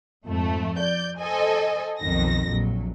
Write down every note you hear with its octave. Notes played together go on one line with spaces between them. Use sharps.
F2 G#2 A3
D5 G6
A4 C5 D#5 G#5
B1 F2 D#3 A#6
A#1 F#3